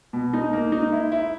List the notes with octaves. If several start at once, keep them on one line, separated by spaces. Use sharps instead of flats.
B2
D#4
A#3
D#4
E4
E4